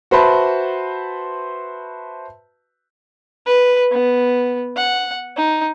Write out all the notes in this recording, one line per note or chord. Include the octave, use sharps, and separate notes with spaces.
F#4 B4 C5 E5 A5 B5
B4
B3
F#5
D#4